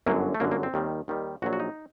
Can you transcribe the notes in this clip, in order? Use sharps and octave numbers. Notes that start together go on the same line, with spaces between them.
G1 F#2 D3 F#3 A#3
A3
G1 F#2 D3 F#3 A#3
A#3
C4
D#2 D#3 G3
D#2 D#3 G3
A#1 A#2 F#3 F#4
F#4
D#4